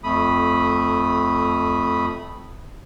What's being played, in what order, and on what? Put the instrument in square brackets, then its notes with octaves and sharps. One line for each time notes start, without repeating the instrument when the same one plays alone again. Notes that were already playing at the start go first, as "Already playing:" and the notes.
[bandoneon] F2 A3 B5 D#6